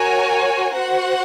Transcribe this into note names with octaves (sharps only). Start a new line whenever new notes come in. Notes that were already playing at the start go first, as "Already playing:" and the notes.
Already playing: F#4 A#4 C#5 G#5
F#4 C5 F#5